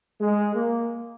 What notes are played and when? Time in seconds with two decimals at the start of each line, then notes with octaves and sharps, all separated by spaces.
0.21 G#3
0.55 A#3